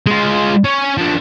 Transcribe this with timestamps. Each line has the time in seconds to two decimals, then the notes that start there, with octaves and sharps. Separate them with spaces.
0.06 G#3 F4
0.64 C#4 C#5
0.97 F3 D4